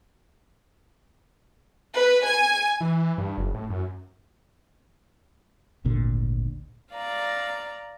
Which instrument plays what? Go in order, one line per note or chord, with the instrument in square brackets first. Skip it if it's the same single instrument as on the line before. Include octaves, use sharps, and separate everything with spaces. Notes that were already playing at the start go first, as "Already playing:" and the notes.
[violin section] B4
G#5
[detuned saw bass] E3
G2
F#1
A2
F#2
[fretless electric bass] G#1 D2 A#2 D3
[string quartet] D5 F5 A#5